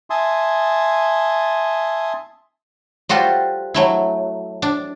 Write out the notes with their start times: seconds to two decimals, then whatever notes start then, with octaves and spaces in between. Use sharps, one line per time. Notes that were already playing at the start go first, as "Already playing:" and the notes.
0.10 E5 G#5 A5 C6 D#6
3.09 G3 F4 F#4 A4 C5
3.74 F#3 A3 E4
4.62 D4